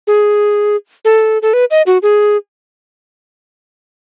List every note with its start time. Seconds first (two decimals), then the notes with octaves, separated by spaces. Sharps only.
0.07 G#4
1.05 A4
1.42 A4
1.53 B4
1.71 D#5
1.86 F#4
2.03 G#4